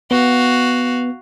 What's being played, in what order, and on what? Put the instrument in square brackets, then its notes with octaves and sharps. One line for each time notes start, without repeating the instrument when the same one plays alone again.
[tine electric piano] B3 [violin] F#4 F5